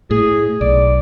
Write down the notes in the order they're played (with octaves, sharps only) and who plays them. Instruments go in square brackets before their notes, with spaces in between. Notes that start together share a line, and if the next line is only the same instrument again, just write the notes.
[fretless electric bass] A2 [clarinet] G#4
[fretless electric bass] B1 [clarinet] D5